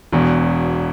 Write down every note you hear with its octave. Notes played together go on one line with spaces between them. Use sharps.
E1 E2 B2